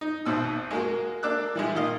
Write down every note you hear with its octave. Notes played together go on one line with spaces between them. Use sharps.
D#4
G#1 G#2 B2 E6
G#3 A#3 F#4
A#3 D4 D6 E6 F#6
E3 G3 G#3
A#2 D#3 D#5 F5